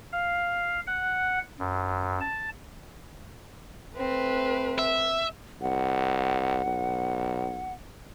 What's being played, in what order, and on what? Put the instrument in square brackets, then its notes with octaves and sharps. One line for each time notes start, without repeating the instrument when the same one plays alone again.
[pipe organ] F5
F#5
F#2
A5
[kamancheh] A3 B4 [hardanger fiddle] C4
[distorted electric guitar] E5
[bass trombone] C2 [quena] F#5
[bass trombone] B1